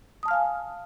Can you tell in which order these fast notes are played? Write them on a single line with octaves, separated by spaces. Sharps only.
D#6 A5 F6 F5 G#5